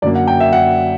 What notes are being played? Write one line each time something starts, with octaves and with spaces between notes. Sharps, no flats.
F#2 D3 F#3 A#3 D4 D5
F#5
G5
E5
F#5